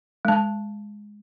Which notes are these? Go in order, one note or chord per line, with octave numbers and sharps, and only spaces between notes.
G#3 A5